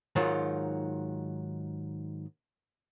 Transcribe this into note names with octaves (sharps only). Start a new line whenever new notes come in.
G#2 D#3 F#3 F4